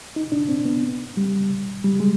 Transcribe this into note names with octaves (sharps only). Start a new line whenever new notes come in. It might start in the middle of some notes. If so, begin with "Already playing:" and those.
D#4
D4
C4
B3
G3
G3
G#3